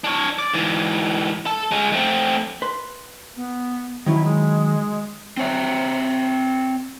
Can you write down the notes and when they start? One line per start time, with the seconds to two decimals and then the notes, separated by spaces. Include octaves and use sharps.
0.04 D4 C#5
0.39 D5
0.54 G#2 E3
1.46 A4
1.72 G#3 C#4
1.92 A3 C4
2.62 B4 C6
3.37 B3
4.06 D#3 F#3 C#4 E4
4.24 G#3
5.37 C4 C#5 E5